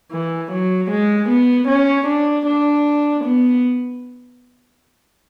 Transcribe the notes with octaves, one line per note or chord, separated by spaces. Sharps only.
E3
F#3
G#3
B3
C#4
D4
D4
B3